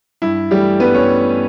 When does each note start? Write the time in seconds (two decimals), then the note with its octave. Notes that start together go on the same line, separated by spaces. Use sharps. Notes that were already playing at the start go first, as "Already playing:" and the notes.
0.22 G2 E4
0.51 E3 G3 A3 G4
0.80 G2 B3 B4
0.95 C#4 C#5